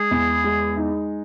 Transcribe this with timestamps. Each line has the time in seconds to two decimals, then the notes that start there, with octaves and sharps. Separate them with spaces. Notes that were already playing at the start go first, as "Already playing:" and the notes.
Already playing: G#3 G#4
0.11 E2
0.44 G#3
0.77 D#4